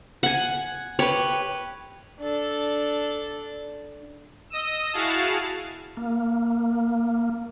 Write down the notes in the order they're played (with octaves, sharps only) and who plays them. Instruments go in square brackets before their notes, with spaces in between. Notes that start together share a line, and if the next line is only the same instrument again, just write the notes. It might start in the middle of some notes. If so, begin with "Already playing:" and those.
[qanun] F#5 G#5
[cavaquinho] G4 B4 [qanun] C#5
[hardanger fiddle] D4 A4
[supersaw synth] D#5 D#6 E6
E4 F#4 G#4 F5 A5
[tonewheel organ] A#3